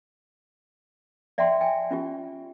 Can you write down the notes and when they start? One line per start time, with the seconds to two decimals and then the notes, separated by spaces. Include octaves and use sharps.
1.38 D5 E5 F#5 G5 A5 C6
1.61 G5 G#5
1.91 C#4 F4 G4